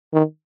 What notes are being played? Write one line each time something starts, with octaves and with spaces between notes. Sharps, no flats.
D#3